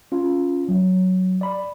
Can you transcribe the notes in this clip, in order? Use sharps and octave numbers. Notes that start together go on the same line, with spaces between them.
C#4 F4
F#3
D5 B5